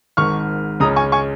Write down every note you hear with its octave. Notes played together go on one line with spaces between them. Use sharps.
G#1 G#2 D#3 C#6 F6
C#2 C#3 G#3 C#4 A#5 D#6
G#5 C#6
G#5 C#6